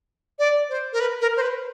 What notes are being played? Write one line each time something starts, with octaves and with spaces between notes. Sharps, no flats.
D5
C5
A#4
B4
A#4
C5
B4